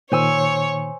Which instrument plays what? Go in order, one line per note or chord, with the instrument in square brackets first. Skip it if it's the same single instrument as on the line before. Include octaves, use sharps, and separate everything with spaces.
[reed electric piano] A#2 D#3 [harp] C5 G#5 E6 [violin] C#5